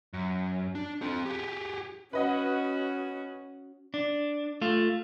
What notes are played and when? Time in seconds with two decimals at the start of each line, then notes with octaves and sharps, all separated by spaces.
0.13 F#2
0.75 D4
1.02 C4 A4
1.25 G4 G#4
2.13 C#4 F#4 B4 D#5 F#5
3.94 D4
4.62 A3 F4